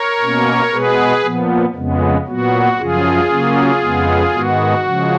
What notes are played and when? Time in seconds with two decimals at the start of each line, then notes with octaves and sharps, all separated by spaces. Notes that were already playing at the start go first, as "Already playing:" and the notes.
Already playing: A#4 C#5
0.20 B2 A#3 C#4
0.72 B2 G#3 B3 G#4 B4
1.23 A#2 F3 B3
1.75 F2 C#3 G#3 B3
2.27 A#2 F#3 B3 F#4
2.78 F#2 C#3 F3 F4 G#4
3.29 C#3 F#3 A#3 C#4
3.81 F2 C#3 G#3 B3
4.33 G#2 D#3 G#3 B3 F#4
4.84 C#3 F3 G#3